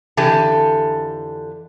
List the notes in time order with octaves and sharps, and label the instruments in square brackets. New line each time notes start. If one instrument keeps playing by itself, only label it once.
[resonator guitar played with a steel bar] F2 D3 E3 G4 A4 G#5